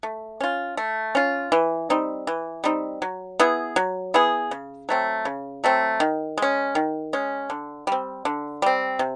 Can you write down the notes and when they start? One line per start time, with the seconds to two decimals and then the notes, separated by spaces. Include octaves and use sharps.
0.03 A3
0.41 C#4 F4
0.77 A3
1.15 C#4 F4
1.52 E3
1.90 G3 C4 D#4
2.27 E3
2.64 G3 C4 D#4
3.02 F#3
3.40 B3 E4 G#4
3.76 F#3
4.14 B3 E4 G#4
4.51 C#3
4.89 F#3 A3 C4
5.25 C#3
5.64 F#3 A3 C4
6.00 D#3
6.38 G#3 C#4
6.75 D#3
7.13 G#3 C#4
7.50 D3
7.87 G3 C4
8.25 D3
8.62 G3 C4
8.99 C3